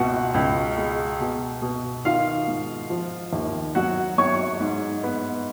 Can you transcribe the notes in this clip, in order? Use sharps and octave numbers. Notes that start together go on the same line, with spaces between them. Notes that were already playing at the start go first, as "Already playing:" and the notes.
Already playing: C#2 B2 F#4 F#5
C#2
G#3
B2
B2
D#3 F4 F5
G#2
F3
D#2
F#3 F#4 F#5
F#3 C#5 C#6
G#2
B3